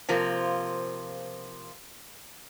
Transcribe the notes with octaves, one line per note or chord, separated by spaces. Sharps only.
C3 F3 A#3